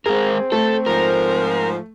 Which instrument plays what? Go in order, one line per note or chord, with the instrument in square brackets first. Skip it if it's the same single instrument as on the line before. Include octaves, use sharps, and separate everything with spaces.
[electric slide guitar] G#3 A#4 [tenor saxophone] C4 [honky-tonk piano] G#4
[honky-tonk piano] A3 [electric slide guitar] A4
[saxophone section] G#2 F3 [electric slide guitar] A#4